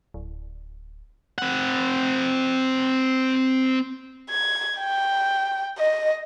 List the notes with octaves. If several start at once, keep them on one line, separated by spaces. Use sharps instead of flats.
D1
C4 F#5
G#6
G5
D#5